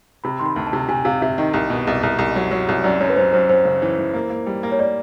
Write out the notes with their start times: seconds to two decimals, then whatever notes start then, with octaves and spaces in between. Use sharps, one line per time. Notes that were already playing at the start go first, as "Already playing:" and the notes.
0.24 C3 B5
0.39 D#3 C6
0.46 B5
0.56 D2
0.67 A5
0.73 C3
0.88 C3 G#5
1.05 C3 F5
1.21 C3 E5
1.38 D#3 D#5
1.53 C2
1.70 B2
1.87 C2
2.03 C2
2.19 C2
2.36 F#3
2.51 F#3
2.69 C2
2.84 F#2 D5
3.00 F#2 C#5
3.10 B4
3.16 F#2 C5
3.33 F#2 C5
3.49 F#2 C5
3.65 C#3
3.82 E3
3.98 E3
4.14 A#3
4.30 A#3
4.47 G3
4.63 A#3
4.72 C#5
4.79 A#3 D5